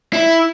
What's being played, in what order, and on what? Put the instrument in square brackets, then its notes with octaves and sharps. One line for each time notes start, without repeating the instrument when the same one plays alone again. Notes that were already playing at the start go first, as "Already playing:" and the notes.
[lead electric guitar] E4